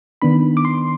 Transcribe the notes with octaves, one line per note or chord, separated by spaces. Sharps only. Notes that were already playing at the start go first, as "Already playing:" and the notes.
D#3 B3 D4 B5
D6
C6